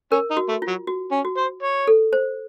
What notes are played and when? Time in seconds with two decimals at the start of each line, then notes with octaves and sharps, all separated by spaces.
0.12 C#4 A#4
0.31 D#4
0.37 F#4
0.49 A3
0.62 F4
0.68 F#3
0.87 F#4
1.12 C#4
1.25 F#4
1.37 C5
1.63 C#5
1.87 A4
2.13 C5